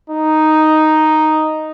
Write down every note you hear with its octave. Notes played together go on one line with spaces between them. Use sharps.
D#4